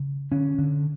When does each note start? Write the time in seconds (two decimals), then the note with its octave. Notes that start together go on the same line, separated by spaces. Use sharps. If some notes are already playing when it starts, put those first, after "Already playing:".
Already playing: C#3
0.32 D3 C#4
0.59 D3